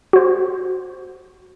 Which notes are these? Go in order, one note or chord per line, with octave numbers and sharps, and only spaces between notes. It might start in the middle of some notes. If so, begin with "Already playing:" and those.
F#4 C5